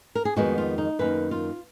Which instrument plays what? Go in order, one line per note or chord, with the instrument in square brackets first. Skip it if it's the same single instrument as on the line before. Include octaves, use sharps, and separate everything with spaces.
[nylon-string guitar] A#4
G#4
F2 D#3 G#3 B3 F#4
F4
D#4
F#2 D#3 A#3 B4
F4